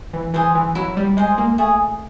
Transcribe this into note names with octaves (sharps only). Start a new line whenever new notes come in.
E3
E3 G#4 C5
E3
F#3 E4
G3
G#3 G#4 C5
A#3
A3 G#4